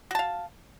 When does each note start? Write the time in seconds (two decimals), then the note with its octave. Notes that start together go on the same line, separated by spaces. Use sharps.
0.11 F#4
0.15 A5
0.19 F5